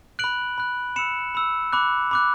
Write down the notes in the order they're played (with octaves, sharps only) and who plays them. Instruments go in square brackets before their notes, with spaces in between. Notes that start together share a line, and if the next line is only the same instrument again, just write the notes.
[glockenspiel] B5 F#6 D7 F#7
B5 F#6
B5 E6 C#7 E7
B5 E6
B5 D6 F#6
B5 D6 F#6